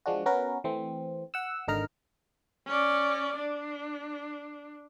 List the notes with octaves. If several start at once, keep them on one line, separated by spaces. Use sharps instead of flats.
F3 G#3 D4 F#4
B3 C#4 F#4 A#4 B4
E3 A3 C4
F#5 E6
G#1 D3 D#4 A#4 A#5 F6
C#4 D5
D4